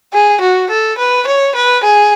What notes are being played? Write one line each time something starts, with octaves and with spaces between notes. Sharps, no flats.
G#4
F#4
A4
B4
C#5
B4
G#4